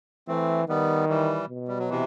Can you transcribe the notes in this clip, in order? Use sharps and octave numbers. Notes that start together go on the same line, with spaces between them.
E3 A3 C4
D#3 G3 B3
E3 G3
B2
G3
F#3
C3 E3